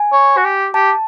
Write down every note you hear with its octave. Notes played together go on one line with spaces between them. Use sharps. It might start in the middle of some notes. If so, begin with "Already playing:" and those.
Already playing: G#5
C#5
F#4
G4
G4 A5